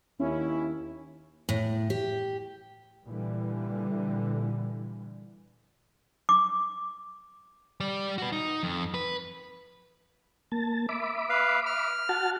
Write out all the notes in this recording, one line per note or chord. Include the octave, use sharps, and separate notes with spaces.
D#2 C#4 E4
A2
G4
A#2 D3 E3 G3
D6
G3 D5
F#4 B4
D#4
F2
B4
A#3 A5
E5 B5 D6
B4 F5
F6
F#4 F#5 A5